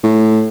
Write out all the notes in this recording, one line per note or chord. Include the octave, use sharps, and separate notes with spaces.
A2